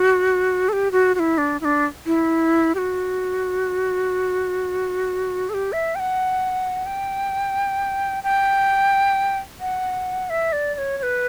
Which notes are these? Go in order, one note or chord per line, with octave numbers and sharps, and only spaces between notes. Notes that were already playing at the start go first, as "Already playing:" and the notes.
Already playing: F#4
A4
G4
F#4
F#4
E4
D4
E4
D4
E4
G4
F#4
A4
G4
E5
G5
F#5
G5
G5
F#5
E5
D5
D5
C#5
C#5
B4